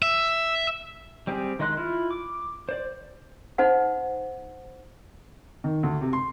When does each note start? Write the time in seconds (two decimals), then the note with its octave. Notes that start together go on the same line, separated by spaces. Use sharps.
0.02 E5
1.27 G3 C4 G4 G#4
1.59 D#3 G#3 D#5 C6 F#6
1.77 E4 F4 F6
2.11 D6
2.69 C5 D5
3.58 D#4 C5 F#5
5.64 D#3
5.83 D2
6.01 C3
6.13 C6